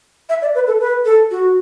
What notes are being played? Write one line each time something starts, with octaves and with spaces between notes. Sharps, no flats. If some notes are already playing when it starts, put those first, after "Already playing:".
E5
D5
B4
A4
B4
A4
F#4